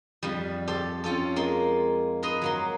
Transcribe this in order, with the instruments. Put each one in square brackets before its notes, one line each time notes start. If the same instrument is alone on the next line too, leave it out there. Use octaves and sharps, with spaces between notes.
[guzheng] F2 G3
G4 A4 C5
C4 C#4 F4 A4
G#3 A#3 C6
A#4 B4 D#5 A#5 C6
F#3 A#3 C6